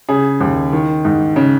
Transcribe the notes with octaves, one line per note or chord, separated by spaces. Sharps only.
C#3 G#4
D#2
D#3
G#2
C#3